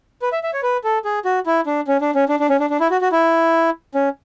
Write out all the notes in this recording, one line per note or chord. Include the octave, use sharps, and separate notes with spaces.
B4
E5
E5
C#5
B4
A4
G#4
F#4
E4
D4
C#4
D4
C#4
D4
D4
C#4
D4
D4
E4
F#4
F#4
E4
C#4